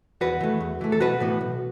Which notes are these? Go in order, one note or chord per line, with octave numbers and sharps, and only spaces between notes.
E2 F#4 B4
E3 A3
E2
E3 A3
A4
B1 F#4 B4
A2 E3 B3
B1